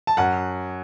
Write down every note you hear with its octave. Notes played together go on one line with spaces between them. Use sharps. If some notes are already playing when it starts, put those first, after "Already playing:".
A5
F#2 F#5